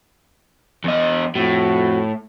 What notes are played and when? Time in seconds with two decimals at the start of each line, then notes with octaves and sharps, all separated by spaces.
0.84 E2 D#5
1.35 F2 A2 F#4